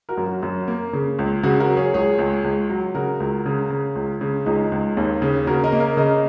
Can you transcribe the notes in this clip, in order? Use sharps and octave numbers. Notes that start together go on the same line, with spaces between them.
F#4 A#4
F#2
F#4
F#2
A#3
C#3
C#2
C#3 F#4
F#4 A#4
F#3
G#4 C#5
C#2 G#4 C#5
C#2
C#2
F#3
C#3 F#4 A#4
C#2
C#3
C#3
C#2
C#3
C#2 D#4 G#4
C#2
D#2
C#3
C#3 F#4 A#4
A#4 D#5
A#3
A#4 D#5
C#3 A#4 D#5